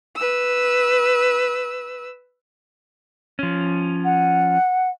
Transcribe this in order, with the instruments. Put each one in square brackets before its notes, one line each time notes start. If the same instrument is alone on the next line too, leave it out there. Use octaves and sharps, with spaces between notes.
[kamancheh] B4 E6
[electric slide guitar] F3 C#4
[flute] F#5